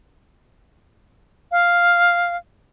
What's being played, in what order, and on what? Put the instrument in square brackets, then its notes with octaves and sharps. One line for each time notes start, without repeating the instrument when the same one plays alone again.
[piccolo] F5